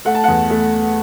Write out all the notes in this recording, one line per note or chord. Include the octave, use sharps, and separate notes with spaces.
A3 F#5
A5
E2 F#5
A3